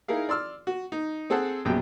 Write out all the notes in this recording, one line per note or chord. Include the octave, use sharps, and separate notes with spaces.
D#4 E4 G#4 A#4 F5
D5 C6 E6 F6
F#4
D#4
C4 G#4 A4 C5 F#5 A5
A#1 F#2 B2 G4 G#4 G5